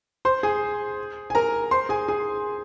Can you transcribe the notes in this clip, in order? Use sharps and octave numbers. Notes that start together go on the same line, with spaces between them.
C5 C6
G#4 G#5
G#5
A#4 A#5
C5 C6
G#4 G#5
G#4 G#5